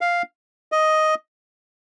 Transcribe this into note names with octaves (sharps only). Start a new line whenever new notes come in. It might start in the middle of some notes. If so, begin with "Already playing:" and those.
F5
D#5